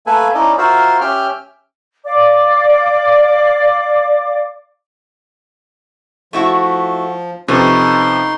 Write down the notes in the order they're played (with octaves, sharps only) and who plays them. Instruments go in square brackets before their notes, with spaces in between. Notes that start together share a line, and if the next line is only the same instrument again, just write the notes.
[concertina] A3 A#3 A4 B4 E5 G#5
C#4 D#4 E4 D5 D#5
F4 F#4 A#4 C5 E5
C#4 G4 E5 G5 F6
[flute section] D5 F5 D6
[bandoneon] F3 [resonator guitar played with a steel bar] A3 E4 F#4
[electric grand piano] C3 F3 [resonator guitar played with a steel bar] C#4 A4 B4 [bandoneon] D#4 C6